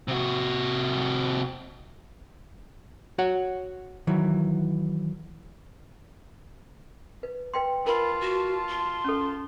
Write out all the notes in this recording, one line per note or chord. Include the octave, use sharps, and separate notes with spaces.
C3 F#4
F#4 C#5 F#5
D#3 E3 F#3
B4
B4 G5 C6
F4 A#4 A5 B5
F#4
C6
C#4 A4